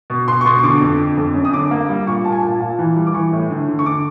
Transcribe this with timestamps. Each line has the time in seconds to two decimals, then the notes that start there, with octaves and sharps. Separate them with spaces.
0.10 B2
0.28 B2 C6
0.41 C#6
0.45 B2 C6
0.59 C#6
0.63 D3 D6
0.81 F2
0.99 D3
1.17 F2
1.35 F#2
1.45 D#6
1.53 D3 D6
1.71 A#3
1.89 G3
2.07 A#2 C#6
2.24 A#2 A5
2.32 G#5
2.40 A#2 A5
2.61 A#2
2.79 E3
2.96 G3
3.07 D6
3.14 E3 C#6
3.33 A2
3.50 D3
3.68 D3
3.79 C#6
3.86 D3 D6